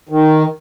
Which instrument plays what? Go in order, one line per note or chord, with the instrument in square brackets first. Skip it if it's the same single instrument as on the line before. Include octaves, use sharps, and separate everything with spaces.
[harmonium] D#3